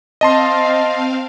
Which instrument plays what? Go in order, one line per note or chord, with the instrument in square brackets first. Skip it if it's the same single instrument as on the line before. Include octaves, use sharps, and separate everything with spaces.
[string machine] C4 F5 [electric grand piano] D#5 A5 C6